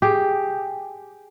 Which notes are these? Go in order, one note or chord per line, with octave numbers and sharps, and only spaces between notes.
G4 G#4